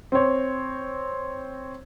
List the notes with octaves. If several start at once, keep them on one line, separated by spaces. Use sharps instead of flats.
C4 C#5